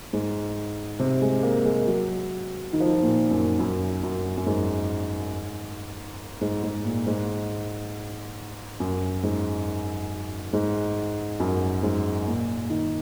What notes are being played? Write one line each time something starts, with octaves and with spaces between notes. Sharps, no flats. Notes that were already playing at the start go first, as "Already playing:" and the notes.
G#2
C3
G#3
A#3
G#3
F#3
D#3
F3
D#3
A#2
F#2
F#2
F#2
F#2
G#2
G#2
G#2
A#2
G#2
F#2
G#2
G#2
F#2
G#2
A#2
D#3